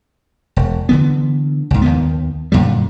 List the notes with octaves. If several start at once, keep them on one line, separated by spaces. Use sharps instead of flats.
E1
D3 E3 B3
C#2 G#2
D#2 D#3 B3
F#2 A#2 D3 G3